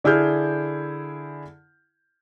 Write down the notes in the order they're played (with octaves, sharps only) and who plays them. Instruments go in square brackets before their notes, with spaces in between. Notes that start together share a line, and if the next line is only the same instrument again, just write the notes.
[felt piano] D3 E4 G#4 F6 G6